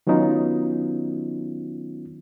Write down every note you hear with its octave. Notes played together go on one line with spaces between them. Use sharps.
D#3 F#3 B3 C#4 D#4 F4